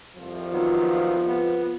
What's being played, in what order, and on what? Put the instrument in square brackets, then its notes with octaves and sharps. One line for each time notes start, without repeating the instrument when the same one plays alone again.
[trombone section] C2 F2 F3
[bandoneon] D#3 F#3 B3 [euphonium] F4
[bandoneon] B3